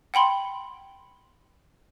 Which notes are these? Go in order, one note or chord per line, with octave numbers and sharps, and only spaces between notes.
F#5 G5 B5 C6